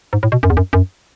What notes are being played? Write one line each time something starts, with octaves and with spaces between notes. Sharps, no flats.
G#2
A2
B2
F#2
E2
F#2
F#2